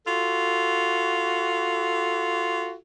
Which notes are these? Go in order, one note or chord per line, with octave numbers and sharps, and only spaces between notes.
F4 F#4 A4